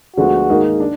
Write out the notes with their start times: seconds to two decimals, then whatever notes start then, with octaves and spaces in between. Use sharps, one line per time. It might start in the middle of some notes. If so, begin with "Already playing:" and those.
0.17 D2 D3 F3 G#3 B3 F#4
0.49 G#2 D#3 A#3 D#4 G#4
0.80 D4